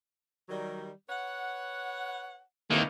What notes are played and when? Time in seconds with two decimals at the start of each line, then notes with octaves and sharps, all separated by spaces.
0.49 D#3 F#3 G3
1.09 B4 C#5 F#5
2.70 F2 D#3 E3 A#3